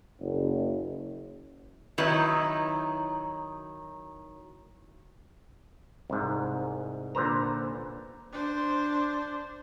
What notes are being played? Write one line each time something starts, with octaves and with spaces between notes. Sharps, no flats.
F#1
D#3 F#3 D#4 E4 B4
C2 G#2
A#2 D3 B4 C5 A#5
D4 C5